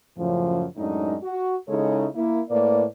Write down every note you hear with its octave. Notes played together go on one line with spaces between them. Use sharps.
F#2 A2 C#3 F3
F#2 A2 G#3 D4 D#4
F#4
C#3 G#3 D#4 E4 A4 C#5
A#3 E4
A2 A#3 B4 D5